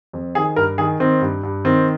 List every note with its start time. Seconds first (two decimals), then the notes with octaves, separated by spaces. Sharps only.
0.13 F2
0.35 D#3 G#4
0.56 G2 A#4
0.78 D#3 G#4
1.00 D#3 C4
1.21 G2
1.43 G2
1.65 D#3 C4